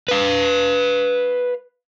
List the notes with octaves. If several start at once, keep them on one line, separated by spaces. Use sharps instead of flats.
B4 F5